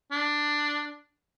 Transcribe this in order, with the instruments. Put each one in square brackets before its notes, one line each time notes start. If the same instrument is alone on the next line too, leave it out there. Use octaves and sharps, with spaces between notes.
[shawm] D4